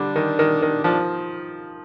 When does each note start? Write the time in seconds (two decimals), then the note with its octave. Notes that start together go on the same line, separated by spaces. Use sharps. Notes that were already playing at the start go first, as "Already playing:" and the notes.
Already playing: D3 G3 D4
0.16 D#3
0.39 D#3
0.62 D#3
0.84 F3 D4